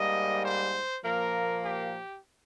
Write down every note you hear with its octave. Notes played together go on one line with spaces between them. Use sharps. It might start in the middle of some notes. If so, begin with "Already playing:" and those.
Already playing: G#2 G3 A#3 D#5
C5
A#2 F3 A#3 A#4
G4